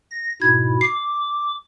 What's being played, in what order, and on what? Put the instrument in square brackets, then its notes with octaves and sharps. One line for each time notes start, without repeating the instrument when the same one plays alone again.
[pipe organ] A#6
[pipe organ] G#2 B2 E4 [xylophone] G#6
[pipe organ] D6 [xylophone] C7